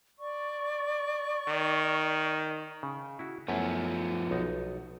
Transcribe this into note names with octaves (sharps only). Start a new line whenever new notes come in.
D5 C#6
D#3
C#3
E4 F#4
F#2 F3 A3 B3 E4
B1 D#4